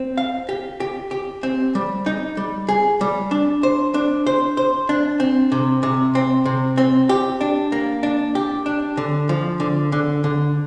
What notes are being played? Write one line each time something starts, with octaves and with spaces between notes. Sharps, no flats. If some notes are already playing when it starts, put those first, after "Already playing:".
Already playing: C4
F5
G4
G4
G4
C4
G3
D#4
G3
G#4
G3
D4
C5
D4
C5
C5
D4
C4
C3
C3
C4
C3
C4
G4
D4
A#3
D4
G4
D4
D3
F3
D3
D3
D3